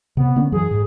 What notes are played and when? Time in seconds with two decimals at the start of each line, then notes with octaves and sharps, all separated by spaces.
0.17 C3 B3
0.36 D3 A#3 C#4
0.52 F#2 E3 F#3 G#4
0.71 G#2